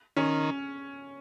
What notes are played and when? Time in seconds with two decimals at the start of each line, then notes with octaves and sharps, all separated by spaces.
0.16 D#3 C#4